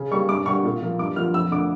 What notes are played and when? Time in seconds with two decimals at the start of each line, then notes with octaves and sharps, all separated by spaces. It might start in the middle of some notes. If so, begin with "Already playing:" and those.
Already playing: C#3
0.11 G3 A#3 C#6
0.29 G2 D6
0.46 D3 G3 C#6
0.65 A#2
0.82 F3 A#3
0.99 G2 D6
1.16 D3 F3 A#3 F6
1.34 F2 E6
1.51 D3 A3 D6